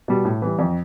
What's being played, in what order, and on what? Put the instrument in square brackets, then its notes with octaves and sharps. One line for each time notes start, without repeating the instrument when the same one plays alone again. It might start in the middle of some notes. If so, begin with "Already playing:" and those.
[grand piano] B2 G3
A2
E3 G3
F2